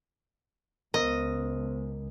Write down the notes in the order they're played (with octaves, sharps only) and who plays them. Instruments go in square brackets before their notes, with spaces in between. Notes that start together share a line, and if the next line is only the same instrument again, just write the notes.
[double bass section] C#2 [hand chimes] B3 C5 [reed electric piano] A#4 [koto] D#5